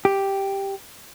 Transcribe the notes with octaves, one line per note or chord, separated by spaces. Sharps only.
G4